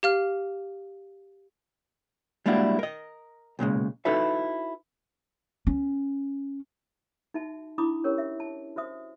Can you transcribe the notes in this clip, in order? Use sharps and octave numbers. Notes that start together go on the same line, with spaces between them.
G4 F5 F6
G3 G#3 A#3 D4 E4 F#4
A#4 D#5
B1 A#2 C#3 G#3
D#4 E4 F#4 A4 B4 E5
C#4
D#4 F#4 E5 A5
D4 E4 B5 D6 D#6
C#4 G4 A#4 C#5
E5
A5
F#4 C5 E5 D#6